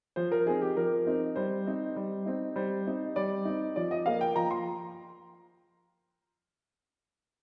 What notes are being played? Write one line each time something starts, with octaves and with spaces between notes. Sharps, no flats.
F3 C5
A#4
C4 D#4 G#4
G4
F3 A#4
C4 D#4
G3 C5
C4 D#4
G3
C4 D#4
G3 C5
C4 D#4
G3 D5
C4 D#4
F3 D5
D#5
A#3 F4 F5
G5
F3 A#5
C6